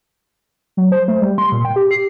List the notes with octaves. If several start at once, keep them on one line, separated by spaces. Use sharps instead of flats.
F#3
C5
A3
G3
C6
A#2
G5
G4
C7